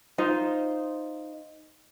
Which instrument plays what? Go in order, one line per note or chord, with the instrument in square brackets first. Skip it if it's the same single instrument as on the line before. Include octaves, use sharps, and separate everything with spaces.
[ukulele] D#4 F4 C5